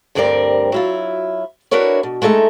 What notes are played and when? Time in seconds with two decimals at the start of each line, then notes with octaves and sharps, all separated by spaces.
0.15 D2 G2 G3 C4 A#4 D5
0.72 F#3 E4 F4
1.71 B3 D4 E4 F#4 A#4 C#5
2.03 B2
2.22 G#3 A3 D#4 D#5 E5